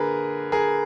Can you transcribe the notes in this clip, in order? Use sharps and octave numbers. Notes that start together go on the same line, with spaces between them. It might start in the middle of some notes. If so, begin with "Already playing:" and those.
Already playing: D3 A#3 G#4 A#4 B4
G#4 A#4